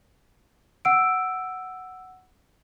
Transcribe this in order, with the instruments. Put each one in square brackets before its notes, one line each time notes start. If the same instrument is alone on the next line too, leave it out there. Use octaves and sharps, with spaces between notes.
[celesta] F#5 E6 D7